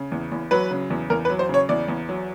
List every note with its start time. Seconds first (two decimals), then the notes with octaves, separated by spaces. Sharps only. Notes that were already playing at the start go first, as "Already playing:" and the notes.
Already playing: C#3
0.12 E2
0.32 E2
0.51 F#3 B4
0.71 C#3
0.90 E2
1.10 E2 A#4
1.25 B4
1.30 F#3
1.39 C5
1.49 C#3 C#5
1.69 E2 D5
1.88 E2
2.09 F#3